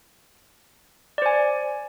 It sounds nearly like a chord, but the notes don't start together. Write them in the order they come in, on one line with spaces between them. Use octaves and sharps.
D5 C5 G#5